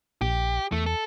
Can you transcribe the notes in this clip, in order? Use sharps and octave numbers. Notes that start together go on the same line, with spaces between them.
A#1 G4
E2 A3
A4